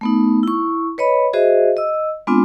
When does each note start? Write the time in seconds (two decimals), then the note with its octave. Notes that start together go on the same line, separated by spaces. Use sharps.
0.01 A3 B3 D#4
0.43 E4 C#6
0.98 B4 C#5 D#5 B5
1.33 F#4 G#4 C5 D#5 E5
1.77 D#5 E6
2.27 G#3 B3 C4 D4 F4